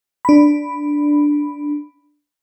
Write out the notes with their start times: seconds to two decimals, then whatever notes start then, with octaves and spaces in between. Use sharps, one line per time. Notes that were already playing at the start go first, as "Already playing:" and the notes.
0.25 D4 B5